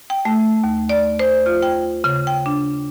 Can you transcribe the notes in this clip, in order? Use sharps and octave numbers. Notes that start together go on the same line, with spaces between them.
G5
A3
D#2
D5
C5
F4
G5
C#3
G5
D4